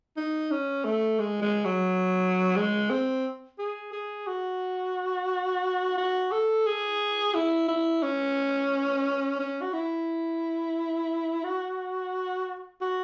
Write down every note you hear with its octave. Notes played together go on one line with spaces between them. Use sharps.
D#4
C#4
A3
G#3
G#3
F#3
G#3
C4
G#4
G#4
F#4
F#4
A4
G#4
E4
E4
C#4
C#4
F#4
E4
F#4
F#4